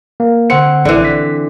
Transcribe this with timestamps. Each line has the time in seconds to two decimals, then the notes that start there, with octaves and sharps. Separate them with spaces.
0.20 A#3
0.50 D3 C4 F#5 C#7
0.85 A#1 D3 E3
1.05 B6